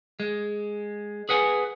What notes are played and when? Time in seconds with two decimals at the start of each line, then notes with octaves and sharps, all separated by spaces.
0.20 G#3
1.29 G#4 B4 F#5 G#5